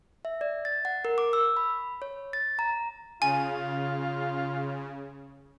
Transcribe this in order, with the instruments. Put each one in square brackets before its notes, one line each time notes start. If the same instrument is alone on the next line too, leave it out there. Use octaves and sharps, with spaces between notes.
[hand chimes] E5
D5
A6
F#5
A#4
D6
E6
B5
C#5
A6
A#5
[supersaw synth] C#3 [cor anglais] F4 [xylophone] G#5